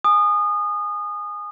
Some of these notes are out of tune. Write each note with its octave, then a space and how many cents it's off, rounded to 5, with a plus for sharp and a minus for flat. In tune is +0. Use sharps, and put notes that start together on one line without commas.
G#5 +0 D#6 -25